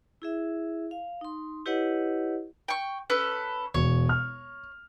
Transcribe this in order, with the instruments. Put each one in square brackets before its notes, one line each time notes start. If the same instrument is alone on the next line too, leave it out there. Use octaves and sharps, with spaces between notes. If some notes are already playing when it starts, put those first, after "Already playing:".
[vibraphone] E4 G#4 E5
F5
D#4 C6
E4 G4 B4 C#5 D#5 F#5
[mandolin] G5 C#6
C#4 A4 B4
[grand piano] E1 [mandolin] C#5
[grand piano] F6